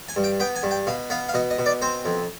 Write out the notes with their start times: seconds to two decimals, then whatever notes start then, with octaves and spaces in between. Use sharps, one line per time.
0.09 G#5
0.16 G2
0.24 G5
0.40 B3 G5
0.56 G#5
0.63 G2
0.71 G5
0.87 B2 F5
1.10 B3 F5
1.29 F5
1.34 B2 D#5
1.50 D#5
1.58 B2
1.66 D5
1.82 C4 C5
2.05 F2